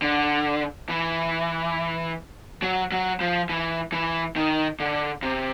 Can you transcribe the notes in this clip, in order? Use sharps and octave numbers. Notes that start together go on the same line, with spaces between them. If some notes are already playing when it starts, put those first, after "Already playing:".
D3
E3
F#3
F#3
F3
E3
E3
D#3
D3
C3